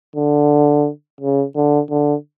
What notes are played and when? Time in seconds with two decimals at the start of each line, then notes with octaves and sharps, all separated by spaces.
0.16 D3
1.21 C#3
1.56 D3
1.90 D3